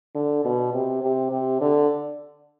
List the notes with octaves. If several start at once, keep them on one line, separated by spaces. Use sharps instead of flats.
D3
B2
C3
C3
C3
D3